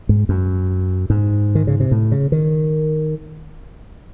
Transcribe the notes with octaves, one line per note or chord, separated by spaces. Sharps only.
G#2
F#2
G#2
D#3
C#3
C3
A2
C#3
D#3